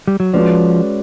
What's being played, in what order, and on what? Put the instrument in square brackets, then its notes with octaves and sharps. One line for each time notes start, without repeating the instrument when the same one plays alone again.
[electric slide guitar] G3
F#3
[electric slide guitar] F3 [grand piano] G#3 C#4 F#4 B4 D5